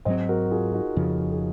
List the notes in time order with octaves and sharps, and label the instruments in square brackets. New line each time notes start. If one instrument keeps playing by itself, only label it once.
[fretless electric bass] G#2 F#3 C4 [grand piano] C5 D#5
[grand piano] F#4 A#4
F4 G#4
D#4 F#4
[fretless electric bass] F2 C#3 F3 [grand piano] F#4 A#4
[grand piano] G#4